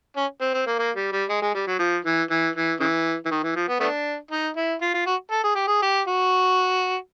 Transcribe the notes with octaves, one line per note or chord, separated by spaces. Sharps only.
C#4
C4
C4
A#3
A#3
G3
G3
G#3
G#3
G3
F#3
F3
E3
E3
E3
C#3 E3
E3
D#3
E3
F3
B3
A3 B3 D4
D#4
E4
F4
F4
F#4
A4
G#4
G4
G#4
G4
F#4